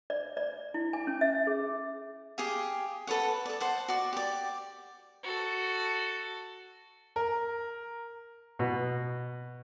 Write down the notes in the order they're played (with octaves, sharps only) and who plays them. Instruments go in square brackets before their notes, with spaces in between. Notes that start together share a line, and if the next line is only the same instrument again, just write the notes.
[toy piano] D5
D5
E4
G#5
C#4
E5
G#4
[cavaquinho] G4 G#4 F5
A4 B4 C#5 F#5
A4 D5
C5 F#5 A5
F#4 D5
G4 D5
[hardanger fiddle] F#4 A4
[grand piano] A#4
[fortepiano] B2